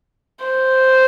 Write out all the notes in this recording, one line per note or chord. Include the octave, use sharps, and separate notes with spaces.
C5